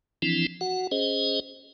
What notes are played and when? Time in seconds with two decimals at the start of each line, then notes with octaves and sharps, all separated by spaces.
0.22 E3 F3 C4 D4 E4
0.61 F#4 F#5
0.92 C#4 G#4 C5 D#5